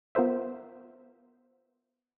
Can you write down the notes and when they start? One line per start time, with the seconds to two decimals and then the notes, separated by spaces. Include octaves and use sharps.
0.15 B3 F4 A#4 C5 E5